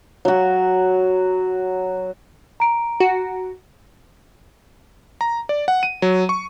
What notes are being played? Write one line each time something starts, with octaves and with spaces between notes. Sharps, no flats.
F#3 F#4
A#5 D7
F#4
A#5
D5
F#5
D#7
F#3
C#6